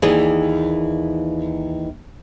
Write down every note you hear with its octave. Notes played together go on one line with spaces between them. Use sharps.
D#2 E3 G#4 D5